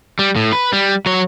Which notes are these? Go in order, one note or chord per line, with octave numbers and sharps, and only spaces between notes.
G3
A2
B4
G3
F#3 C#5